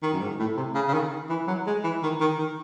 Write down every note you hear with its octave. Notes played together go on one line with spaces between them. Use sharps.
D#3
F#2
G#2
A2
C3
C#3
C#3
D#3
E3
F#3
G#3
E3
D#3
D#3
D#3